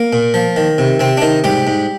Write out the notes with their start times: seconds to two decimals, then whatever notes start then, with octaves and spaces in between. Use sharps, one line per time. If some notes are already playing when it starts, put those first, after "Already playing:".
Already playing: A#3
0.13 A#2
0.34 F3
0.56 D#3
0.78 C3
1.00 C3 C4
1.17 D4
1.22 D#3 D#4
1.44 G#2 G3 G4
1.67 G#2